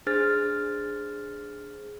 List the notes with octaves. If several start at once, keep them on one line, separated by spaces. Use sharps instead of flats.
D4 G#4 C5 F6 A6